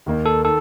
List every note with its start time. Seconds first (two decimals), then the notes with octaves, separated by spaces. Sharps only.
0.06 D#2 D#3 A#3 D#4
0.26 A4
0.44 D#3 A4